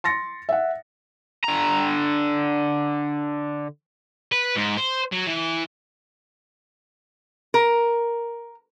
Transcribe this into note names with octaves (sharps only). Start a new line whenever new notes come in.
C6 A6 A#6 C#7
E5 F#5
D3 A#5
B4
G#2
C5
F#3
E3
A#4